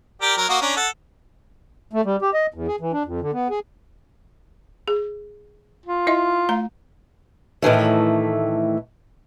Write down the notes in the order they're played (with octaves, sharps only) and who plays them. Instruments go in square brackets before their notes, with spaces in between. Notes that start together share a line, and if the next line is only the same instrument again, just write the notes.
[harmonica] G4 A#4 D5
F#3 A#4
A#3 F#4 D#5
C#4 D4 A#5
A4 F#5
[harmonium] A3
G3
G4
D#5
E2
G#4
E3
D4
F2
D3
B3
G#4
[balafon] G#4
[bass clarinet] F4
[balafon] E4 D#5 E5
A3 A#5
[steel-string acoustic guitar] A2 D#3 E3 A3